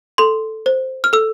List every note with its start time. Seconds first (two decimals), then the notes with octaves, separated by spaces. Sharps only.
0.18 A4 C6
0.66 C5
1.04 F6
1.13 A4 E6